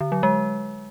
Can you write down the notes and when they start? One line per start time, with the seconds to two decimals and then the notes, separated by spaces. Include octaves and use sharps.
0.01 D3
0.12 F#3
0.23 G#3